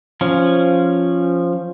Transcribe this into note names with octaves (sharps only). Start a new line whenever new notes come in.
F3 C#4